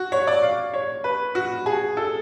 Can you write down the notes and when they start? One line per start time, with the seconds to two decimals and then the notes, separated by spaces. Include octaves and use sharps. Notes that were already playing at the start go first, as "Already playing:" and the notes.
Already playing: F#4
0.12 C#5
0.27 D5
0.43 F5
0.74 C#5
1.04 B4
1.35 F#4
1.66 G#4
1.97 A4